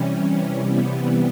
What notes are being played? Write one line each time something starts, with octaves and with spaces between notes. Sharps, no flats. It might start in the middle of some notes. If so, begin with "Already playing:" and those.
Already playing: C3 E3 G3 C#4
B3